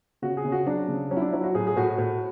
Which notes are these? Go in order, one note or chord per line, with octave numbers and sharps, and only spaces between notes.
C#3 F#4
G#4
C#3
F#4
F#3 D4
C#3
F#3 C#4
E4
D4
F#3 E4
F#4
A2 G#4
G#4
A2 F#4
A2